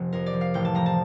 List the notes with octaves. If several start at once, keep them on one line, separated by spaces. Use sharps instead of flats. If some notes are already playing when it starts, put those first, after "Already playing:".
Already playing: F1 C3 F3
F2 A#4
D5
F3
F5
A1 G5
A5
F3 A#5
A5